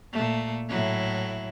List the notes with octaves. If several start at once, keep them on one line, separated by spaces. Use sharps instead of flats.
A#2 A3
A2 F#3 E4